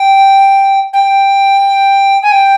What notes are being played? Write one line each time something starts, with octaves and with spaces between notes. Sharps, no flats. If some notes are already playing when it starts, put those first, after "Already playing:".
Already playing: G5
G5
G#5
G5